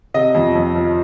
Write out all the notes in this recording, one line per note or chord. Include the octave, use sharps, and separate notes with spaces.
C3 D#5
F2
F2
F3